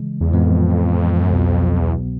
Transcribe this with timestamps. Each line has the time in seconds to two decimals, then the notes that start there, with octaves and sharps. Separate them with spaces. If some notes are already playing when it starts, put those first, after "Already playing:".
Already playing: C#3 E3 G#3
0.21 E2
0.32 F2 A2 E3 G#3 B3
1.22 F#2
1.30 C2 F2 B2 F#3 B3
1.80 E2